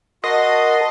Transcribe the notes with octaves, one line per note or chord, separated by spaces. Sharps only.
F#4 A#4 D#5 A5 C6